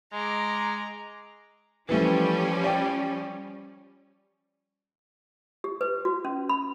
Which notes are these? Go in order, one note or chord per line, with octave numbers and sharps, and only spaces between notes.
G#3 A#5 D6
E3 F3 G3 A3 C#4
D5 G5
G4
B4
F#4
C#4
B5